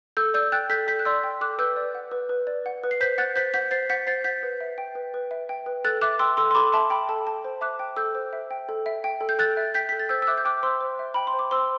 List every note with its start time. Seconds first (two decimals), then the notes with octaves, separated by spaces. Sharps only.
0.17 A4 E6 G6
0.34 D5 E6 G6
0.52 G5 F#6 A6
0.70 A4 G6 B6
0.87 A4 G6 B6
0.99 F#6
1.05 D5 C6 E6
1.24 G5
1.41 A4 D6 F#6
1.59 B4 E6 G6
1.76 D5
1.95 F#5
2.12 B4
2.29 B4
2.47 D5
2.66 F#5
2.84 B4
2.91 C7
3.01 C5 G6 B6
3.18 F#5 F#6 A6
3.36 C5 G6 B6
3.54 F#5 G6 B6
3.71 C5 A6 C7
3.90 F#5 G6 B6
4.07 C5 A6 C7
4.24 F#5 G6 B6
4.43 B4
4.61 E5
4.78 G5
4.95 B4
5.14 B4
5.31 E5
5.49 G5
5.66 B4
5.84 A4 F#6 A6
6.01 E5 D6 F#6
6.19 G5 C6 E6
6.37 A4 C6 E6
6.51 C6
6.55 A4 B5 D6
6.72 E5 A5 C6
6.90 G5 B5
7.09 A4 A5
7.26 A4 A5
7.45 C5
7.61 E5 D6 F#6
7.79 G5
7.97 A4 E6 G6
8.15 C5
8.33 E5
8.51 G5
8.69 A4
8.86 E5
9.04 G5
9.21 A4
9.29 G6
9.39 A4 F#6 A6
9.57 E5
9.74 G5 G6 B6
9.89 A4 B6
9.99 A6
10.09 C5 E6 G6
10.22 E6
10.27 E5 D6 F#6
10.38 G6
10.45 G5 D6 F#6
10.63 C5 C6 E6
10.81 C5
10.99 E5
11.14 G5 B5
11.27 C6
11.33 C5
11.39 D6
11.51 C5 C6 E6